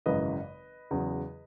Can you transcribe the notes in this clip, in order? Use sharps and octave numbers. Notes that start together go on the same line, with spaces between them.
G#1 F#2 C#3 E3 B4 D#5
E2 C#3 F#3